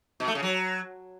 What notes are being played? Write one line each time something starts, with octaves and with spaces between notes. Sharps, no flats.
B2
A3
C#3
F#3